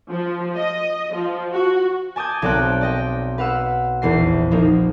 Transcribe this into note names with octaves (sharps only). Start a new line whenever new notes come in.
F3
D#5
F3
F#4
G#5 A5 D6 D#6 G6 G#6
B1 C4 D5 G5 F#6
D5 D#5 G5
B4 F5 F#5 E6
F1 A#1 E2 C7
F3 A#3 D#4